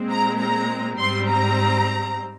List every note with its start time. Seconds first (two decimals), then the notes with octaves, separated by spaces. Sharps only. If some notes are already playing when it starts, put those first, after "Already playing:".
Already playing: A#2 G#3 C4
0.10 A#5
0.39 A#5
0.98 G#2 G3 C4 C6
1.29 A#5